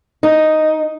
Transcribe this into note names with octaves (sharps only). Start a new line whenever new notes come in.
D#4